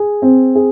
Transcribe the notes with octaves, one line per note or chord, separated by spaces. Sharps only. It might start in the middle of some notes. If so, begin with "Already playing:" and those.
Already playing: G#4
C4
G#4